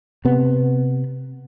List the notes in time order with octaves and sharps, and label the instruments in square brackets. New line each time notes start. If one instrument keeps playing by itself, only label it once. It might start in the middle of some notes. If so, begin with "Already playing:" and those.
[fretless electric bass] C3 B3